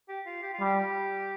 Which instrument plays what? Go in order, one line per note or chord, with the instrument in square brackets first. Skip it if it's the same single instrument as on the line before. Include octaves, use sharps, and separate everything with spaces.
[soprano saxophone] G4
F4
G4
F4
[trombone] G3
[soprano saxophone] G4